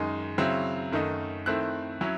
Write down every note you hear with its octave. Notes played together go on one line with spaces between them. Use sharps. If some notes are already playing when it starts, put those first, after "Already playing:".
Already playing: F#2 D#3 G#3 D#4
C#3 F#3 C4 E4
F#2 D#3 A3 D#4
D#3 A3 C4 E4 F#6
F#3 C#4 E4